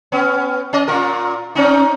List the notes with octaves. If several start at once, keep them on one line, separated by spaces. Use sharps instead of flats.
B3 C#4
C#4 D#5
A#2 F4 A#4
C4 C#4 D#4